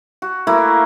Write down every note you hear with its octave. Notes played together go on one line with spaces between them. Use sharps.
F#4
A3 A#3 E4 F#4